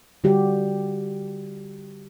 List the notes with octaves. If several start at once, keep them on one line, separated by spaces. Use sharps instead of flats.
D3 G3 F#4 G4